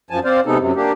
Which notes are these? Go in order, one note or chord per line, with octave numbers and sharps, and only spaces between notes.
F#2 F3 G#5 A5
C4 C5 D5 F5
C3 G#3 B3 D#4 A4
F#2 C3
A#3 D4 G4